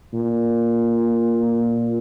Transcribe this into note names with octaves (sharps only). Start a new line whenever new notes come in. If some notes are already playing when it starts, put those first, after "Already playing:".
A#2